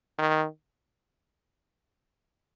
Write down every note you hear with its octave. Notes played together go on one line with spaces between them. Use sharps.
D#3